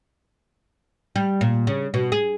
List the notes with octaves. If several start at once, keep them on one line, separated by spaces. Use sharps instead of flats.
G3
A#2
C#3
B2
G#4